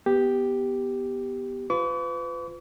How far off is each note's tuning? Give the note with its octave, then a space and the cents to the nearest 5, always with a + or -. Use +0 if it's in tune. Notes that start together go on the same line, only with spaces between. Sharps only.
B3 +0 G4 +0
F4 +0 B4 +35 D6 -45